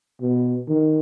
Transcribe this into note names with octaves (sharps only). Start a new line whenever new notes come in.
B2
D#3